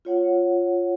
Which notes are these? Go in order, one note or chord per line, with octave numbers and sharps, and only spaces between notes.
F4 C#5 F#5